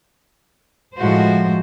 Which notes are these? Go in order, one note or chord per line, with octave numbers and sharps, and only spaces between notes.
A2 F3 G#3 F#4 C5